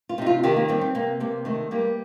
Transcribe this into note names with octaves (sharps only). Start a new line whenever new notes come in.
F4
C3 D#4
F4
D#3 G4
A#3
G3 C4
C4
C3 A#3
C3 A#3
D#3 A3
G3 A#3